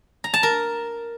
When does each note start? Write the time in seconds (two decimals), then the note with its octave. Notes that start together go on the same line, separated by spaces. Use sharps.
0.24 A#5
0.34 A5
0.43 A#4